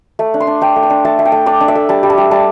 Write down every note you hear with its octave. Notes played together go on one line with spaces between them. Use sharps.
A3
D4
C6
D4
D4 G5
A3
A5
D4
A3 A5
A3
G5
A3
D4 D5
D4
E5
A3
G3 A5
G3
A5
G3
G3 A5